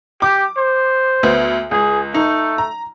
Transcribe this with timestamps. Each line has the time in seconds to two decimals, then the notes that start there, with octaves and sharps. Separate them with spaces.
0.22 G4 D6
0.58 C5
1.23 D2 B3
1.71 C#2 G#4
2.14 A3 D#4
2.58 A#5